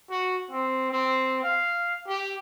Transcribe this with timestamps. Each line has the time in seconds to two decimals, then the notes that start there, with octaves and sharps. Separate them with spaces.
0.10 F#4
0.51 C4
0.91 C4
1.43 F5
2.07 G4